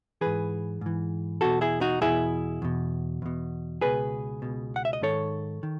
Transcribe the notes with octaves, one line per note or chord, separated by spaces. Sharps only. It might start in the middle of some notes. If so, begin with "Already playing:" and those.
G#2 E3 G#4 B4
G#2 E3
E2 B2 F#4 A4
E4 G#4
D#4 F#4
E2 B2 E4 G#4
E2 B2
E2 B2
C#2 B2 G#4 B4
C#2 B2
F#5
E5
D#5
G#2 D#3 A4 C#5
D#3